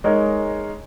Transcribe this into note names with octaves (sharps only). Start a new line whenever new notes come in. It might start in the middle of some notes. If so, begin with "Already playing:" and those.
G#3 D#4 A#4 C#5